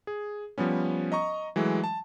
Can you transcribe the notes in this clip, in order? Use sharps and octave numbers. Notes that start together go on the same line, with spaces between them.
G#4
F3 G3 B3 C#4
D#5 A#5 C#6
E3 F#3 G#3 A3
A5